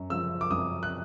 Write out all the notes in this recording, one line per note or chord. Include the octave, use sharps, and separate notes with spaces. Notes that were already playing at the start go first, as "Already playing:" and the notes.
Already playing: F#2
C#3 F3 E6
D6
F#2 D#6
F#6